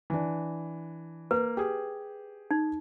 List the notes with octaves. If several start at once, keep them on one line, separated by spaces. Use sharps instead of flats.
E3 D4
A#3 B4
G4 G#4
D#4